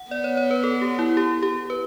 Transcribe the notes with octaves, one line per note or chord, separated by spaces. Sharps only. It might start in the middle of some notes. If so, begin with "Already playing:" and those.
Already playing: F#5
B3 D5
C#5
C#5
B4
A4
G4
E4
G4
G4
B4